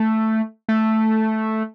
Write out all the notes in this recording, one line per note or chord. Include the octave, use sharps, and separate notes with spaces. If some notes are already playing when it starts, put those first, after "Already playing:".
Already playing: A3
A3